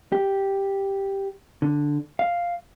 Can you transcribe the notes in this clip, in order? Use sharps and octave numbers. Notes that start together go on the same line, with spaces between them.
G4
D3
F5